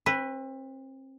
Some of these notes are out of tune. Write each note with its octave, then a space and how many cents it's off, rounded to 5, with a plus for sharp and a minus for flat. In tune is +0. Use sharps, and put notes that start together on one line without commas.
C4 +35 B4 +0